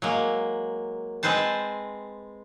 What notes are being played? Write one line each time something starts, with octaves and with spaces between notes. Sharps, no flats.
F#3 G#3 A#3
G#3 C4 B4 C5 A5